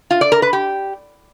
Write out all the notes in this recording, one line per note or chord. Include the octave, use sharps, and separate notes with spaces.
F4
D5
A#4
B4
G4